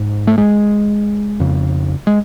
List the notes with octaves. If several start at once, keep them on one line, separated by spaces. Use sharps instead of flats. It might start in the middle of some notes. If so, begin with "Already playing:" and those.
Already playing: G#2
A3
G#3
F2 C#3
G#3